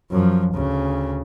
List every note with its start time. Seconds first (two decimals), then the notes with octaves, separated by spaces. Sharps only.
0.11 F#2 F3
0.54 D2 C#3